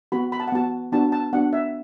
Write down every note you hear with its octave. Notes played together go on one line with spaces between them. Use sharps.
B3 F#4 B5
B5
A5
F#5
B3 F#4 A5
B3 D4 F#4 A5
A5
B3 D4 F#4 F#5
E5